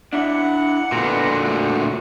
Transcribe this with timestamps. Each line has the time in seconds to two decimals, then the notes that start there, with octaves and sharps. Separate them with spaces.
0.13 D4 E4 D5 F#5
0.92 A#2 D3 B3 F#4
1.42 D2 F#4